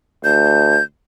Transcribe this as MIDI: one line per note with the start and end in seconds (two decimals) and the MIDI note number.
0.24 0.80 38
0.24 0.84 91